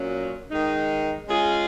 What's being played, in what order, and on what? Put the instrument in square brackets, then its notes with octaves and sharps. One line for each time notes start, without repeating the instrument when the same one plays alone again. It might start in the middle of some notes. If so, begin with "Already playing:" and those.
Already playing: [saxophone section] A#2 F#3 C#4
D#3 G#3 D#4
G#3 C#4 F4 G#4